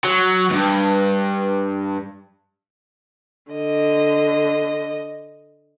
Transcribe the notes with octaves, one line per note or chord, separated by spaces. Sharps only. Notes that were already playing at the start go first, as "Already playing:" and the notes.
F#3
D2 G2
D3 D#5